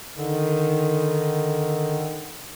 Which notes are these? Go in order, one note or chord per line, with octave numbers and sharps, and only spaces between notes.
D3 D#3